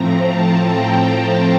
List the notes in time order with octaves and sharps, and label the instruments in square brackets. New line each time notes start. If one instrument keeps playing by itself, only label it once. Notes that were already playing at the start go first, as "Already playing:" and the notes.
Already playing: [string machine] A2 F3 A3 C4 A#5
A5
G5